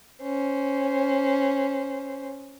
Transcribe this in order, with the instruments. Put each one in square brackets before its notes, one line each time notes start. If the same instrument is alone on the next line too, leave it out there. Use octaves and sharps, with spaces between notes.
[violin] C#4 C5